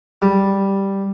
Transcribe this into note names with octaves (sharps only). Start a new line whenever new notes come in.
G3